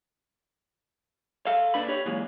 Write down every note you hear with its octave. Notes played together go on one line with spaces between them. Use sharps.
A4 F5
A#2 D4 B4 B5
G4 C#5
F#2 A#2 E3 G#3